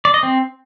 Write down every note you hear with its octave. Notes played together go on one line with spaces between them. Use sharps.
D5
D#5
C4